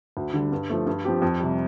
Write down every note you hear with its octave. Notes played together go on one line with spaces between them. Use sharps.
D2
D3 G3
G2
F3 A3
G2
F3 C4 G4
F2
C3 G3